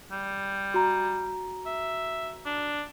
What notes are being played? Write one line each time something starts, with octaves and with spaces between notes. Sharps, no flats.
G3
F#4 A#5
E5
D4